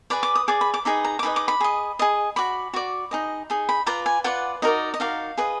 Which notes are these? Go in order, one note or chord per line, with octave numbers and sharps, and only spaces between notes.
G#4 B4 D5 B5
D6
D#6
G#4 B4 D5 D6
B5
D6
D#4 G#4 B4 D#5 B5
A#5
D6
D#4 G#4 B4 D#5 B5
D6
B5
G#4 D#5
G#4 D#5
F#4 D5 B5
F#4 D5
D#4 G#4 D#5
D#4 G#4
B5
F4 B4 D5 A#5
G#5
F4 B4 D5 F#5
D#4 F#4 A#4 D5 D#5
D#5
D#4 F#4 A#4 D5 F5
G#4 B4 D#5